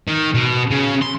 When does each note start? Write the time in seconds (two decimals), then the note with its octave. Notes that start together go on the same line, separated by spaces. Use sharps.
0.08 D#3
0.34 B2
0.71 C#3
1.02 C6